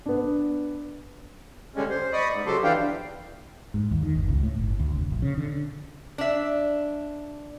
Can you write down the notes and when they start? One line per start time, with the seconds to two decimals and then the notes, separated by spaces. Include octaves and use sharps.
0.06 B3 D4
1.76 D3 G3 G#3 C#4
1.89 C5
2.13 D5 D#5 B5 C#6 D#6
2.31 G#2
2.46 C#3 F#3 G4 A4 C5
2.64 E3 B3 D4 F5 G5
3.74 G#2
3.91 D#2
4.03 D#3
4.16 G1
4.29 C#2
4.43 A2
4.58 G1
4.79 D2
4.92 F1
5.10 A#1
5.22 C#3
5.38 D3
6.18 D4 E5